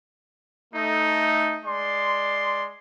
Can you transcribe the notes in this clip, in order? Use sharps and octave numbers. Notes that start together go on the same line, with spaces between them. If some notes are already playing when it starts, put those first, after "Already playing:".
A3 D#4
G#3 D5 C6